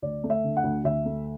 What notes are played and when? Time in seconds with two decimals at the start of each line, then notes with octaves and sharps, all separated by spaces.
0.02 D2 D5
0.24 A3
0.30 E5
0.44 D3
0.57 F#5
0.63 D2
0.84 D2 E5
1.05 A3